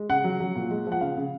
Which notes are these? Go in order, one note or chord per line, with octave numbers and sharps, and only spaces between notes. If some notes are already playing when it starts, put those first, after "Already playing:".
Already playing: G#3
C#3 F#5
F#3
F#3
A#2
G#3
F3 F#5
C#3 F5
C#3